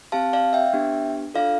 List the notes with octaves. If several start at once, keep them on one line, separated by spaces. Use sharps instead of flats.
C4 G4 F5 A5
D5 F5
E5 G5
B3 D4 G4
D4 F4 A4 D5 F5